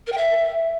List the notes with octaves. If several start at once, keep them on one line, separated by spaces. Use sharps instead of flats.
A#4
G5
E5